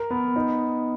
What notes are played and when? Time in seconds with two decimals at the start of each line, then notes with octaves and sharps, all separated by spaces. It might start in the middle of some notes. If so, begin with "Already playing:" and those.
Already playing: A#4
0.11 B3
0.36 D#4